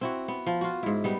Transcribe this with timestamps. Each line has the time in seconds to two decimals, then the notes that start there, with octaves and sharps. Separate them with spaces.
0.01 C4 E4 F#4
0.28 B3
0.46 F3
0.61 F4 F#4
0.83 G#2 E4
1.04 G3 B3 D#4